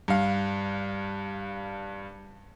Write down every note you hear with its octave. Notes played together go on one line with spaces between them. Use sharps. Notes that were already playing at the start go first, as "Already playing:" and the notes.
G2 F5